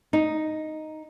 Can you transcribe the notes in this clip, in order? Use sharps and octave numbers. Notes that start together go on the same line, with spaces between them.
D#4